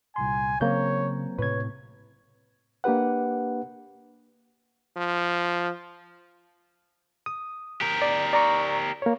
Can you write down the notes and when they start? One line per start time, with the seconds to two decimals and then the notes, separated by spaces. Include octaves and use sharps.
0.16 C2 A#2 G#5 C6
0.61 C#3 F#3 A#3 C4 C#5 A#5 G6
1.39 A2 C3 B4 C#5 G#6
2.84 A#3 D4 G4 B4 F#5
4.97 F3
7.26 D#6
7.81 G4 A#4
8.02 D5
8.33 D5 A#5 C#6
9.02 A#3 C#5